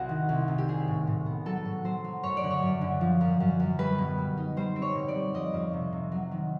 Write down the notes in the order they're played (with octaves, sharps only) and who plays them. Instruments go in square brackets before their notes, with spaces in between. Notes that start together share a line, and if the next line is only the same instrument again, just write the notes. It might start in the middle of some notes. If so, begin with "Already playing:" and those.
Already playing: [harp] C2 C3 F#4
D#3
C2
C3
G4
D4 G#4
A2
A2
B3
F#3 A4
A2
F#3 C5
F#3
F#2 C#5
D5
D3
C#5
F#2
D3
F3
F#2
F#2
F#2
G3 B4
B2
G3
D#4
G3 C5
C4
C#5
B2
D5
G3
F2 D#5
F2
C3
C3
F#3
D#3